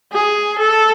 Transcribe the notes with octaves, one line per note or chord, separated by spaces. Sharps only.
G#4
A4